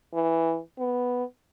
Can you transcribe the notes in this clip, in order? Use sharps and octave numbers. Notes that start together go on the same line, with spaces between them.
E3
B3